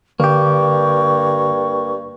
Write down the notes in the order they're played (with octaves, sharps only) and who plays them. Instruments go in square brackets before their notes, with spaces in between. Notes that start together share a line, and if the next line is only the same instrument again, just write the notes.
[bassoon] G2 [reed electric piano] D3 [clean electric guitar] A#3 G4 [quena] C#6